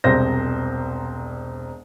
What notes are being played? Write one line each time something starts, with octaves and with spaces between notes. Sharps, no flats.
E1 C2 C5 A#6